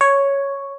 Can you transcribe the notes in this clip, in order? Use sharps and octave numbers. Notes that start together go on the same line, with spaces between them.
C#5